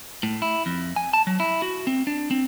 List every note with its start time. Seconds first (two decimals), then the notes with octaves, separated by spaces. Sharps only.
0.23 A2
0.42 E4
0.66 F2
0.96 G#5
1.13 A5
1.27 F#3
1.40 E4
1.62 F#4
1.87 C4
2.07 D4
2.31 C4